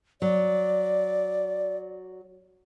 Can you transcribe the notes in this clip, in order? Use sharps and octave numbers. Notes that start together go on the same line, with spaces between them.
F#3 D5